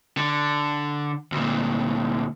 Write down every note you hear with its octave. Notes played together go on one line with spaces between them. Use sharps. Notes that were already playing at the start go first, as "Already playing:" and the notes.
D3
D2 A#2